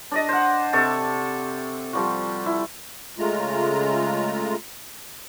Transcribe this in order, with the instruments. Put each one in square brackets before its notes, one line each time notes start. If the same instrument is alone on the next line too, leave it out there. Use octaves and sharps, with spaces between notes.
[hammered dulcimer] D4 D5 D#5
C5 F#5
C3 A4 D5 C#6
F3 G3 F#4
E4
[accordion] C#3 G#3 A3 F4 A#5